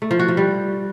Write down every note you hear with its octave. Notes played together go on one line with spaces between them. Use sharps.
A3
F3
F#4
F3
G3